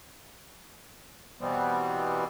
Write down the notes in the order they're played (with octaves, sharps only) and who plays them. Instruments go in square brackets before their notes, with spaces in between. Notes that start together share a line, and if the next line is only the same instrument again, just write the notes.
[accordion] B2 E3 G3 B3 C4